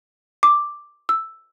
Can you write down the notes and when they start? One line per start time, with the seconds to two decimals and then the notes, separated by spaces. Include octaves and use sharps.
0.43 D6
1.09 E6